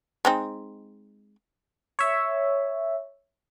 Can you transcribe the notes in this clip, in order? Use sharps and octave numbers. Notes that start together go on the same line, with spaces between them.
G#3 C4 D#4
C#5 E5